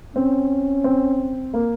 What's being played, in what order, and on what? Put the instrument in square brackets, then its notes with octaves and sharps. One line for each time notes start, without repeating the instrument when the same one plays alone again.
[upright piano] C4 [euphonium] C#4
[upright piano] C4
A#3